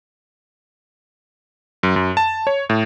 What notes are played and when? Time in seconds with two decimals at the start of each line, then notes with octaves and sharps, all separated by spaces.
1.83 F#2
1.96 F#2
2.17 A5
2.47 C#5
2.70 A2